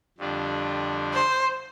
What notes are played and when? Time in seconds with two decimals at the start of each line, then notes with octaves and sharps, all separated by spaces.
0.18 F2 D3 G3 D4 F4
1.14 C5